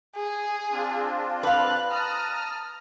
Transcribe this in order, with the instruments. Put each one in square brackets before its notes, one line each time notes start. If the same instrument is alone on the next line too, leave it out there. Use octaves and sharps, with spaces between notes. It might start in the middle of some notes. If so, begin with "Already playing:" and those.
[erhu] G#4
[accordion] C4 D4 F4
[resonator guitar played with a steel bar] B4 F5 [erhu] F#6
[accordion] A5 A#5 D#6 [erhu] F6